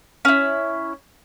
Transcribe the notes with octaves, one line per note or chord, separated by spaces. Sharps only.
C#4 E4